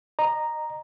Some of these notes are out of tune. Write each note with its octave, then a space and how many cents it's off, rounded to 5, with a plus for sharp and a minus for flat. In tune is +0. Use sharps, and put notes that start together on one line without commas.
D#5 -30 A#5 +0